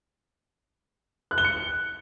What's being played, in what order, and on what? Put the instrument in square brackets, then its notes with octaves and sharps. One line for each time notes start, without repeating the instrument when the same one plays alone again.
[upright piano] F#6
G7
C#7